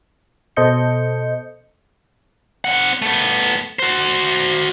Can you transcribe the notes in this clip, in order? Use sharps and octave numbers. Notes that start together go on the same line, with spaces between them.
B2 A4 C5 D#5 G6 C#7
C4 F#5
A3 B3
F#4 C5